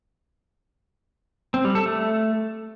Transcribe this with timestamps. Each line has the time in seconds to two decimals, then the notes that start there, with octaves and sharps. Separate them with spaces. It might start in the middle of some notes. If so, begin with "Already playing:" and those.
1.54 C4
1.65 G3
1.75 A4
1.86 A3